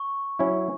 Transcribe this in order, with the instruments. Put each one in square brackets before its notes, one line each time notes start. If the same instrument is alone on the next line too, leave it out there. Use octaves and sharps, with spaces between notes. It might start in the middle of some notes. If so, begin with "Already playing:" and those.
Already playing: [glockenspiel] C#6
[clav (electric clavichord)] F#3 C#4 E4